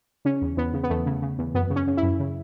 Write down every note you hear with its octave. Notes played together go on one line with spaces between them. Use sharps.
C#3 C#4
E2
E2 B3
C#3
B3
E2 A3
C#3
C#3
E2
F#2 B3
C#3
C#4
C#3
E4
F#2
C#3